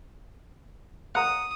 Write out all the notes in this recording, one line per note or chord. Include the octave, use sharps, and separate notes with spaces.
F#5 A#5 D#6